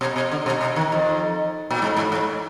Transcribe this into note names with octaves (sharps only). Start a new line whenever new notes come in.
B2
B2
D3
B2
B2
D#3
F2
A#2
G#2
G#2
G#2